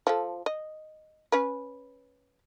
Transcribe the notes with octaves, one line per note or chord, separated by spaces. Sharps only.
F3 A4
D#5
C#4 B4